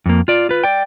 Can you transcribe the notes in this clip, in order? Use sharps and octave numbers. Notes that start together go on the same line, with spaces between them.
F2 A#3
F4 D5
F4 B4
D5 G5